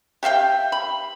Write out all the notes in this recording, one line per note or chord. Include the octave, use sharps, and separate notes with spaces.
G4 E5 F5 G5
B5